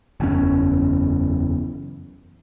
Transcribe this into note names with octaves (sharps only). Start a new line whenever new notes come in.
F#1 E2 C#4